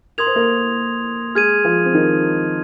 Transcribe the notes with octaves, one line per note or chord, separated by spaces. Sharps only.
A#4 C6 D#6 G#6 F7
C5
A#3 A#4
G#3 G#4 F6 G#6 D#7
F3 F4
C4
D#3 D#4